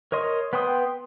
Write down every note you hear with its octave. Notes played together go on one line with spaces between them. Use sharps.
A#4 C#5 D#5 C6
B3 B4 G5 C6 D#6